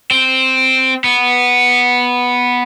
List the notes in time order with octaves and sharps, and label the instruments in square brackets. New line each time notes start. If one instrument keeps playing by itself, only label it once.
[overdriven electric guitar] C4
B3